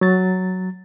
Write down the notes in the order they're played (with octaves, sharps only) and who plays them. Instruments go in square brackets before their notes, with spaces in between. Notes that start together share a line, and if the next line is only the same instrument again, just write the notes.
[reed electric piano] F#3 A6